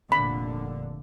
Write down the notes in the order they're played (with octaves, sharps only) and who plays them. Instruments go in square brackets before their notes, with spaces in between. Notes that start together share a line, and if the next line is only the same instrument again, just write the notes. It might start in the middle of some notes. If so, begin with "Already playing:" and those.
[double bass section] F1 A#2 D3 [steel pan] B5